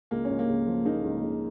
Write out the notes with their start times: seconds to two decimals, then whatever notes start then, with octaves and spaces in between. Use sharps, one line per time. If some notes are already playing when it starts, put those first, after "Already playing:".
0.11 C#2 A#3
0.25 C#4
0.30 C#2
0.39 A#3
0.49 C#2
0.67 F3
0.85 C#3 A#3 D#4
1.04 C#2
1.23 C#3